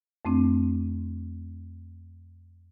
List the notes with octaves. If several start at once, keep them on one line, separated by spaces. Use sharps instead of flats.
F2 A3 C4 D4